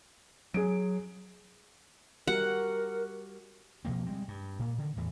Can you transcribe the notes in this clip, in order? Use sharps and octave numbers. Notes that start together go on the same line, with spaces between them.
F#3 G#4 D7
G3 F#4 G4 A#4 F#5
B2 F3 A#3 C4
G3 G#3 C4
G2
A#2 A#3
D3 D#3
E2 A2 E3